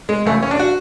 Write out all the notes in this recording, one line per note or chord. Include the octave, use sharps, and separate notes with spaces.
G#3
F#2 C#3 E3 A3
C#4
D4
F#4